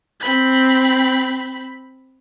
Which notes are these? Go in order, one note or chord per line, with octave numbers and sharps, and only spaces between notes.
C4 B5